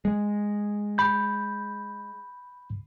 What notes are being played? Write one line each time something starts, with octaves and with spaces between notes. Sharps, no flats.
G#3
B5 G6